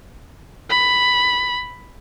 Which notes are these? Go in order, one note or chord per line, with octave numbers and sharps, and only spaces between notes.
B5